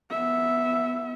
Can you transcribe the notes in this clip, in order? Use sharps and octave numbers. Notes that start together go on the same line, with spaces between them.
B3 E5